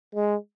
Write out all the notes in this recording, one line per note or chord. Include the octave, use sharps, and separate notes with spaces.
G#3